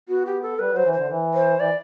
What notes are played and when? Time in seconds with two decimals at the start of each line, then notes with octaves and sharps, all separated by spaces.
0.09 B3 F#4
0.26 G4
0.42 A4
0.59 G3 B4
0.72 F#3 C5
0.85 E3
0.93 D3 C5
1.10 E3
1.34 C5
1.59 E3 D5